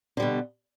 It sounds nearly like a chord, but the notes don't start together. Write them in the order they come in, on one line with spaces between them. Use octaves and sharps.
D3 G3 B2